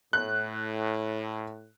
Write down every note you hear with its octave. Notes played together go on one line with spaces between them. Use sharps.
A2 F#6